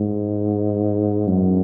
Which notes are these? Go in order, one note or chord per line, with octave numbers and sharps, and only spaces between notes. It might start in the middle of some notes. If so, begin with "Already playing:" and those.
Already playing: G#2
F#2